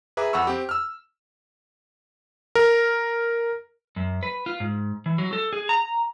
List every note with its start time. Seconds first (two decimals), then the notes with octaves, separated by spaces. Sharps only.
0.17 G#4 B4 E5 A#5 D6
0.33 F2 F#5 B5 C#6 E6
0.47 C4 G4
0.69 E6 F6
2.55 A#4
3.96 F#2
4.23 B4
4.46 F4
4.60 G#2
5.06 E3
5.18 F#3
5.33 A4
5.53 G#4
5.69 A#5